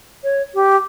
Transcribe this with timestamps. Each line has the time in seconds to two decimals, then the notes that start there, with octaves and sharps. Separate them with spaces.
0.24 C#5
0.54 G4